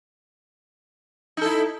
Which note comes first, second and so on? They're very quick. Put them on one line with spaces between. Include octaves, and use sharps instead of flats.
D#4 A4 E4